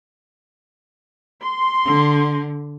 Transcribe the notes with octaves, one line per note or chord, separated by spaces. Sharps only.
C6
D3